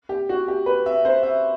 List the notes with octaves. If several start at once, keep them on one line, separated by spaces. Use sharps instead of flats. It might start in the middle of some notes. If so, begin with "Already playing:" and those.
G4
F#4
G4
B4
E5
C5
E5